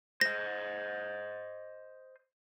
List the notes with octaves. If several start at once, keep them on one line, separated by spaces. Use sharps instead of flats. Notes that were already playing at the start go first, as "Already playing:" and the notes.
C5 D#5 A#6